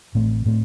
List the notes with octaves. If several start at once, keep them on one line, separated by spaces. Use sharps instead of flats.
A1 A2 A3 C4
A2 A3 C4